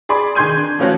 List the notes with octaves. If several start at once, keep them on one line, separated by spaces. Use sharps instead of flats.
G#4 D5 B5 C6 D6
D#3 G#4 C6 G6 G#6 D#7
D4
E3 F3 A3 C#4 F4 F#4